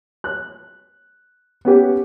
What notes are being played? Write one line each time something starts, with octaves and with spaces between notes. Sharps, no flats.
F#6
B3 C#4 G4 B4